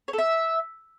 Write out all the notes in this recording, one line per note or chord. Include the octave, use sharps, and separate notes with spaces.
C#5
A4
E5